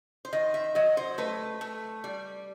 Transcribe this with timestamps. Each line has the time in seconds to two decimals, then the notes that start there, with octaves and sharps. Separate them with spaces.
0.25 C5
0.33 D#3 D#5
0.54 E5
0.75 F#3 D#5
0.97 C5
1.18 A3 B4
1.61 A3
2.04 G3